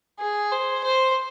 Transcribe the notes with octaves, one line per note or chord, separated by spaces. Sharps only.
G#4
C5
C5